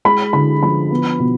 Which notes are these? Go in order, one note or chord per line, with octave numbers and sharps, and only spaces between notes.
G#3 B5
D3 B5
F3 B5
B3
B2